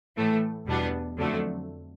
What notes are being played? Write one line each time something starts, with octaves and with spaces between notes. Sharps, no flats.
A2 E3 A3
E2 B2 G3 B3 D4
F2 D3 F#3 A3